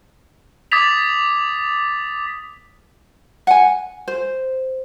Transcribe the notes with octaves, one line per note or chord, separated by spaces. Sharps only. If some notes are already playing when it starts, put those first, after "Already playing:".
D6 D#6 G#6 A6 B6 F7
F#5 G#5
C5